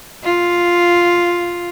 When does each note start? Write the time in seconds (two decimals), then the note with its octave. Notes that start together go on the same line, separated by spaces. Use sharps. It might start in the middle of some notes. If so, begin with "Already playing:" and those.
0.24 F4